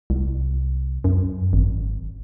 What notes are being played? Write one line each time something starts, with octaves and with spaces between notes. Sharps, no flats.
C2
F#2
G#1